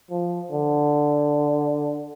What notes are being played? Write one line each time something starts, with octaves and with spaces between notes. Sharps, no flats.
F3
D3